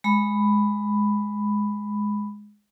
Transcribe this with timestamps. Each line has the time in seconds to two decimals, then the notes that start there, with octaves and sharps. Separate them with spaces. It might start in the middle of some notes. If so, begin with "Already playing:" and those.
0.04 G#3 B5